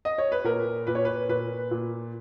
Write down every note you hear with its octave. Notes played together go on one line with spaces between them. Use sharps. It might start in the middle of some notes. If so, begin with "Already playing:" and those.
D#5
C#5
B4
A#2 A#4
A#2 B4
C#5
B4
A#2 B4
A#2